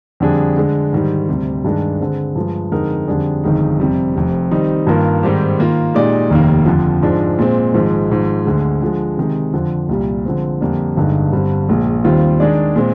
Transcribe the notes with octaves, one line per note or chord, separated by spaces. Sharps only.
F2 D3 G3 D4 G#4
D3 G#3 D4
G#2 D#3 G3
D2 C3 G3
G2 D#3 G#3 D4
D3 G#3 C4
G2 F3 G#3
F2 D3 G#3 D#4 A#4
F2 D3 G3 D4 G#4
G1 F2 D#3 G#3 D#4
F2 C3 G3
F1 F2 C3
D#3 G3 C4 D#4
G2 D#3 A#3 F4 A#4
G#2 D#3 G3 C4 G4
D#3 A#3 F4
A#2 G#3 D#4 G4 D5
F1 D#2 D#3 A#3
F2 D3 F3
G#2 F3 G#3 D4
A#2 G#3 C4
G#1 G#2 F3 G#3
G#1 G#2 F3
D2 D3 G#3
D3 F3 G#3
C3 D#3 G#3
F2 D3 F3
C2 A#2 G3
D3 F3 G#3 C4
F2 D3 G3 A#3 D4
G1 G2 D3 G#3 D#4
G1 G2 D3 G3 C4
A#1 A#2 G#3
D#2 D#3 G3 C4 F4
D#3 G#3 D4 G#4 D5
A#2 G#3 C4